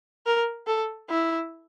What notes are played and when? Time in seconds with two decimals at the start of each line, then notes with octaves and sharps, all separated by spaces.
0.26 A#4
0.67 A4
1.10 E4